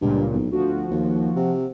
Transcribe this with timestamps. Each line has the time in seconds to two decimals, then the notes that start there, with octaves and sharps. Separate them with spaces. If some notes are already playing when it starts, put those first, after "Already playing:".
0.01 C#2 G2 A#2
0.32 B1
0.52 D2 F3 F#4
0.91 D#2
1.36 C3